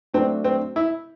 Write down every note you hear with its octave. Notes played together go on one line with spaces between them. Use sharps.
F#3 A3 C4 D4 F#4
C4
E4